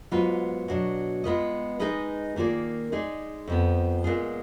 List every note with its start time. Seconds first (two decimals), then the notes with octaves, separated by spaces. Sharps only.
0.11 G#2 F#3 B3 F4 B4
0.68 B2 F#3 D4
1.24 G#3 B3 F4 B4 D#5
1.80 G#3 D#4 G#4 B4 D#5
2.36 D#3 A#3 F4 G#4 D5
2.92 G#3 D#4 G#4 D5
3.47 F2 F3 B3
4.04 A#2 G#3 B3 F4 G#4